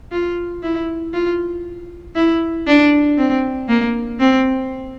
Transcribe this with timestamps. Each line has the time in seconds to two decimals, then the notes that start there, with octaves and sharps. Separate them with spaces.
0.12 F4
0.63 E4
1.13 F4
2.15 E4
2.67 D4
3.18 C4
3.69 A#3
4.20 C4